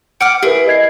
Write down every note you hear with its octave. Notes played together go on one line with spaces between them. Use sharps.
F#5 D6 F6 D7
E4 G4 G#4 A#4 B4
D#5 G#6 C7